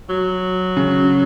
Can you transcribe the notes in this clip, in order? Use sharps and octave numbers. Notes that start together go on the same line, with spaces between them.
F#3
C#3